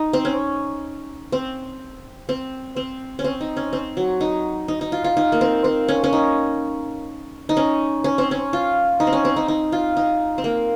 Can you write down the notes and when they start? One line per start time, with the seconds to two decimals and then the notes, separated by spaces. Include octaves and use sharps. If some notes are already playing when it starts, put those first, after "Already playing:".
Already playing: D#4
0.13 C4
0.25 C#4
1.32 C4
2.29 C4
2.76 C4
3.19 C#4
3.24 C4
3.41 D#4
3.57 C#4
3.73 C4
3.97 F#3
4.21 D#4
4.68 D#4
4.81 D#4
4.92 F4
5.04 F4
5.17 D#4
5.32 A#3
5.41 C4
5.64 C4
5.88 C#4
6.04 C#4
6.13 D#4
7.49 D#4
7.57 C#4
8.04 C#4
8.18 C4
8.31 C#4
8.53 F4
9.00 D#4
9.07 C4
9.13 C#4
9.25 C4
9.36 D#4
9.48 D#4
9.72 F4
9.97 D#4
10.38 C4
10.44 A#3